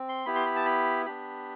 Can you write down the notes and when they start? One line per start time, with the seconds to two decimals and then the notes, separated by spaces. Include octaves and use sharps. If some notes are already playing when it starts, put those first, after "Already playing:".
Already playing: C4
0.09 C6
0.26 B3 E4 G4 B5
0.35 C6
0.46 B5
0.56 A5
0.66 B5
1.06 B3 D4 G4 B5